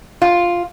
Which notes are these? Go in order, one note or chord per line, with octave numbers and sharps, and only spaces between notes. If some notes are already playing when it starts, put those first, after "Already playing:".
F4